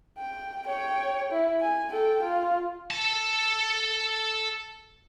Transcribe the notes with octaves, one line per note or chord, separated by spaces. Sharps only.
G5
C#5 G5
E4
G#5
A4 G5
F4
A4 A5